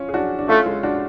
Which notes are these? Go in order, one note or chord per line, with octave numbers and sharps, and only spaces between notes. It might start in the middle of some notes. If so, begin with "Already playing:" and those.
Already playing: C#4 F4
G#4
D4 F#4
D4
A3 C#4 F4
G#3
D4 F#4